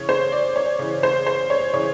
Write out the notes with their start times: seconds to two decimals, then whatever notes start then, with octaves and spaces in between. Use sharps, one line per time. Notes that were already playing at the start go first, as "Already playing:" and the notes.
Already playing: C#3 E3 C#5
0.09 C5
0.32 D5
0.56 C#5
0.79 C#3 E3
1.03 C5
1.26 C5
1.50 C#5
1.74 C#3 E3 C#5